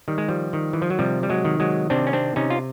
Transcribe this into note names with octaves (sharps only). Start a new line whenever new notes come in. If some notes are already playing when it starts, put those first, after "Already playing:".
D#3 G3
G#3
F3 G3
D#3
E3
F3
F#3
C3 F3 G3
G3
F#3 G#3
D#3
F#3 G#3
C3 C4 D4
C#4
C4 D4
C3 C#4 D#4
F4